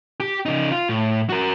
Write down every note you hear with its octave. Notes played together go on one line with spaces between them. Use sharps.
G4
C#3 D#4
F4
A2
F#4 A#4